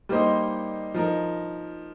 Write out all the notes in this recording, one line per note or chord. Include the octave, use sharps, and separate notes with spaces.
G3 A#3 D#4 C5 D#5
F3 D#4 A#4